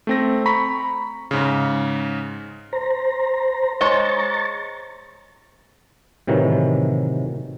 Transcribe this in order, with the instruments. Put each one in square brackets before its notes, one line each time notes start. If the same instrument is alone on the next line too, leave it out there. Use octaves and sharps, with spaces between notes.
[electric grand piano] A3 C4 A#6
A#5 B5 C#6 B6
G#2 C#3
[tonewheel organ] C5 A#5
[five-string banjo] G#3 C5 C#5 [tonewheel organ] A#5 C#6 A6
[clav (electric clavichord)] A2 C3 D#3 E3 F#3